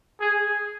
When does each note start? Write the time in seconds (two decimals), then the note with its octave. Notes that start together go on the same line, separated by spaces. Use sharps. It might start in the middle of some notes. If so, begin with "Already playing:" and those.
0.21 G#4